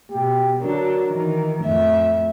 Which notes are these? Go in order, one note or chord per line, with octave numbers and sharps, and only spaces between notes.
B2 G4
D3 F#3 D4 A#4
D#3 E3
F2 A2 E5